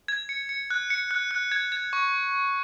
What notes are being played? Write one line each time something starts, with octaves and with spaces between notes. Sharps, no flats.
G#6
C#7
C#7
F#6
C#7
F#6
F#6
G#6
G#6
C#6